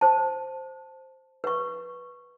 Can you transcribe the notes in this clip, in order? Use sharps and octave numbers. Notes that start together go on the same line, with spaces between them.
C5 A5
B4 C#6